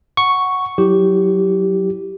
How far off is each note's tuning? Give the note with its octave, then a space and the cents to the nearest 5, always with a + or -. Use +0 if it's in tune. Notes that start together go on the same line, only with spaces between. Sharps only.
F#5 +0 C#6 +0
F#3 +0 E4 +0 G4 -10